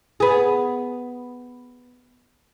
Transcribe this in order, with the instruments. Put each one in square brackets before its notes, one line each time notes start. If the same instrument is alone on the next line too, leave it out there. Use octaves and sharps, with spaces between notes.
[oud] B3 G#4